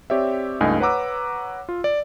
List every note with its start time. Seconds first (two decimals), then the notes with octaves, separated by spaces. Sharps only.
0.10 C4 G4 C#5 D5 E5
0.61 C#2 G2 A3 D#4 D#5 G#5
0.80 B4 C#5 F#5 A#5 D6 E6
1.69 F4
1.84 D5